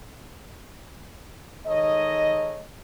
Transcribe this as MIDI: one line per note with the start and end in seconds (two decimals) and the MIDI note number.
1.67 2.62 51
1.67 2.62 56
1.67 2.62 63
1.67 2.62 69
1.67 2.62 73
1.67 2.62 75